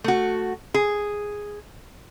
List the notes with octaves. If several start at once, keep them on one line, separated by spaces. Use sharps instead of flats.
A3 F#4
G#4